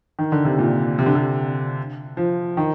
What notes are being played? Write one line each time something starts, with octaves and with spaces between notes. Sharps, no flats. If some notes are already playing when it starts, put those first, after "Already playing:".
D#3
D3
C3
A#2
C3
D3
C3
F3
D#3